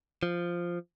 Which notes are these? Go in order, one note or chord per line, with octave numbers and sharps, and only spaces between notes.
F3